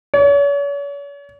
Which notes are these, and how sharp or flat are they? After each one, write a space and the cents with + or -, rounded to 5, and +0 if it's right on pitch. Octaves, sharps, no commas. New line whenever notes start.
C#5 +40